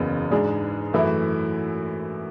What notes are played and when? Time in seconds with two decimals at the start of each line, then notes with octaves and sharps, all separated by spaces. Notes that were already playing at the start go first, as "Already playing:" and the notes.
Already playing: F#1 E2 C#3
0.31 G#2 G#3 D4 G#4
0.93 F#2 E3 A3 E4